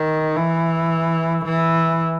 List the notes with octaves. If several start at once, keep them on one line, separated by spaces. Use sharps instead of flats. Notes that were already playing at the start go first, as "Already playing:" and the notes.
Already playing: D#3
E3
E3